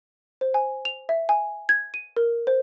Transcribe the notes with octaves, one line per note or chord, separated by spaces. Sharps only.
C5
G#5
F7
E5
G#5
G#6
D#7
A#4
C5